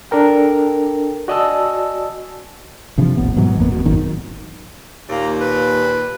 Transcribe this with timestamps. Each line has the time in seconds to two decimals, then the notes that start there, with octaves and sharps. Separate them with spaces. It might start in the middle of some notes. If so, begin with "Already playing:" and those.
0.11 D4 A4 A#4 G5
1.28 F#4 D5 D#5 G#5 A5 E6
2.98 G2 C3 E3 F3
3.17 D#1 A1 B3
3.36 G#2 B2 E3 F#3
3.58 G#1 F2 A#3 B3
3.71 E1 B2
3.86 G#1 F#2 D#3
5.10 D#2 A#2 A#3
5.41 B4